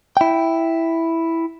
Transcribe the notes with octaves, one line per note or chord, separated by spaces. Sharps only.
E4 G5